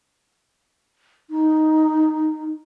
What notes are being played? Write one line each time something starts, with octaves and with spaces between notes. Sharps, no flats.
D#4